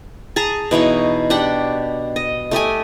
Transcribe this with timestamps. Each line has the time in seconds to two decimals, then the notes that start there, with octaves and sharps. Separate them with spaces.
0.36 G#4 A5 A#5
0.71 B2 E3 D#4 C#5
1.30 D4 G4 F#5 G5
2.16 D#5
2.51 A3 G4 D#5 G#5